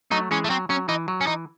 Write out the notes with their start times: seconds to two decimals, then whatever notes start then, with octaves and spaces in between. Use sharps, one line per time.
0.11 F#3 A3 D#4
0.31 E3 G#3 C#4
0.44 A3
0.50 F#3 C4
0.69 F#3 C#4
0.89 E3 D#4
1.08 F#3
1.21 C#4
1.27 E3 D#4